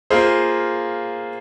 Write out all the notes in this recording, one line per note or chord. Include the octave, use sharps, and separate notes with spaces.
A#3 F4 G#4 C5